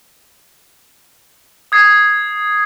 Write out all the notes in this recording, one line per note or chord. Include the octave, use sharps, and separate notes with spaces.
D#6 G#6 C7